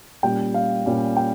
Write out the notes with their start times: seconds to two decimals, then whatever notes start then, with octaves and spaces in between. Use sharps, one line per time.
0.23 A#2 G3 C#4 G5
0.54 F5
0.86 A#2 G3 C#4
1.17 G5